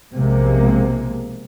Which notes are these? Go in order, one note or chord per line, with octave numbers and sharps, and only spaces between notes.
B1 C3 F3 G#3 A#3